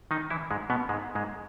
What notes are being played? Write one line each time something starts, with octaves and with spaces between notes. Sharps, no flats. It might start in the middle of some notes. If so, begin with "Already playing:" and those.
D#3 D#4
E3 E4
G#2 G#3
B2 B3
G#2 G#3
G#2 G#3